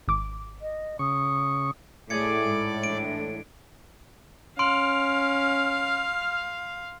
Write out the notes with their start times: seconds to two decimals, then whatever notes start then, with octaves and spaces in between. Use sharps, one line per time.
0.08 G#1 D6
0.61 D#5
0.99 C#3 C#6 D#6
2.10 A2 A3 G#4 D5 D6 G#6 C#7
2.45 G#2
2.84 E3 G#3 D4 D7
4.59 C#4 F5 C6 F6 D7